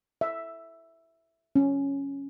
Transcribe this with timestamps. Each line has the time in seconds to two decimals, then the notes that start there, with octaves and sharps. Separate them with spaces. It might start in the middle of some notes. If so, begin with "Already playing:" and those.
0.21 E5
1.56 C#4